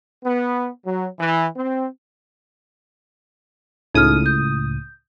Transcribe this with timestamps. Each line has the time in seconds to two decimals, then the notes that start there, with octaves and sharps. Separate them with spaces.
0.25 B3
0.86 F#3
1.19 E3
1.56 C4
3.94 C#2 A2 D#4 D#6 F6
4.26 G6